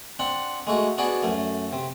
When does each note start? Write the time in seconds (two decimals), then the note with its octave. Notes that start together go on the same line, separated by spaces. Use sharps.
0.19 C4 D4 F#5
0.67 G#3 A3 F#4
0.98 B3 D4 F#4 G#4 D5
1.23 F#2 A3
1.73 C3